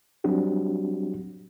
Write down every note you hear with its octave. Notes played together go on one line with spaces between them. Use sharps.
F#3 G3 C4 D4 F#4 G4